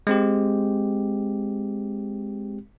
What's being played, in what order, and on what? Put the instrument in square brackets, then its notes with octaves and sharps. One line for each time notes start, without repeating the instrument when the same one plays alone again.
[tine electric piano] G#3 C4 G4